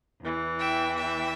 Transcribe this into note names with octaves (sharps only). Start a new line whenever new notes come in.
E2 E3
E5 G5
E5 G5